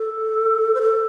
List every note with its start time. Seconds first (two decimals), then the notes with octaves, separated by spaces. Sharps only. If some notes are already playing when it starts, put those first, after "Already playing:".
Already playing: A4
0.75 C5
0.82 A4